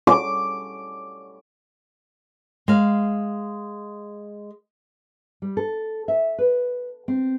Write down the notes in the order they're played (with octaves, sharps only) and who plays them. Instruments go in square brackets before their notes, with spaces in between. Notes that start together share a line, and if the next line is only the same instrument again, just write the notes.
[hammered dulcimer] D6
[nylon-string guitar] G#3 F5
G3
A4
E5
B4
C4